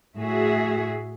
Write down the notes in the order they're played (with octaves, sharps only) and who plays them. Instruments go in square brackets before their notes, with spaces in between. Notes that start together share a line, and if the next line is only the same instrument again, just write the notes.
[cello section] A2 F#4 G#4 E5